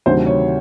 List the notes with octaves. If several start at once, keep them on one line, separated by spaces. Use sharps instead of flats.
D2 C3 D#3 F#3 C5
C#5